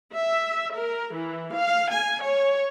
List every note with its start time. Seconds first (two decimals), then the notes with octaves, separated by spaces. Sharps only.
0.12 E5
0.74 A#4
1.15 E3
1.53 F5
1.90 G#5
2.24 C#5